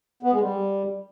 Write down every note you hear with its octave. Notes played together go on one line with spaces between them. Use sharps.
B3
G#3
G3